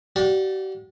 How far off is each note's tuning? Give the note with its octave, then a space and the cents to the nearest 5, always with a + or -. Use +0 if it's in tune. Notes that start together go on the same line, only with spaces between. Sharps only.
G4 -45 D5 +0 F#5 -35